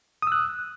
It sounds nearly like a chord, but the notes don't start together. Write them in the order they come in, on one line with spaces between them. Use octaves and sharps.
D#6 E6 F#6